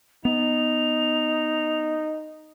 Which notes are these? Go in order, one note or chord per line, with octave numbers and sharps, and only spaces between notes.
B3 D#4 F7